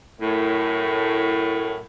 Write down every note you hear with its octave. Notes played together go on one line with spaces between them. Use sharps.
F#2 A2